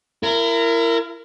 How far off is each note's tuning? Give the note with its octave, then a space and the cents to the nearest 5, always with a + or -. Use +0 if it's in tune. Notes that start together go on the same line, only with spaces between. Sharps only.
E4 +30 A#4 -15